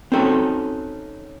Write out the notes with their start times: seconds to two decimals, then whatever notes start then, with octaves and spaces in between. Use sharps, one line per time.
0.12 C4 C#4 D#4 F#4 A4